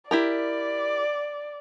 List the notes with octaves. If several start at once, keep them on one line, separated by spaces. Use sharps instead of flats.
E4 G4 A#4 D5